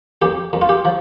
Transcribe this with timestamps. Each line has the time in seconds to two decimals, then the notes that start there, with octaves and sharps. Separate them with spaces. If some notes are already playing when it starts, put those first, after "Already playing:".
0.22 F2 G4
0.53 F2
0.61 F4
0.69 G4
0.85 F3